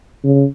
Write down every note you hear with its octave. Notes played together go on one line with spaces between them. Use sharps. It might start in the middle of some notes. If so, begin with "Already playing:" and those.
C#3